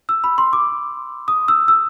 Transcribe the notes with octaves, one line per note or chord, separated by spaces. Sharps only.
E6
B5
C6
D6
D#6
E6
E6